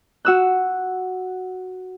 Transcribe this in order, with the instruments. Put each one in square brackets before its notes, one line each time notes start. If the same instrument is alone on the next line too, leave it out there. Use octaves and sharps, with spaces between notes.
[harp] F#4 E6 F#6